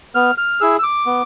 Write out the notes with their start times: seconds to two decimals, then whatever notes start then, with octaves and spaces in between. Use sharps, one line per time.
0.15 B3 F6
0.38 F6
0.61 E4 G#4 E6
0.79 E6
0.83 D6
1.06 B3